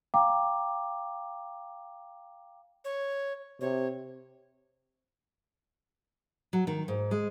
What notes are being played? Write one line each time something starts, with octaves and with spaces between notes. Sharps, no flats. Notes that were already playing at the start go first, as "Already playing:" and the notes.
F5 G5 A#5 D6
C#5
C3 C#5
F#3
D#3
G#2
G#3